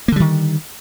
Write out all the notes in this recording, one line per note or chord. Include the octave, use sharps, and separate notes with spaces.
D3 D#3 G3 A#3